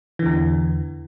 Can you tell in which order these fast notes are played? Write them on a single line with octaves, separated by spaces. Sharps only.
E3 D3 E2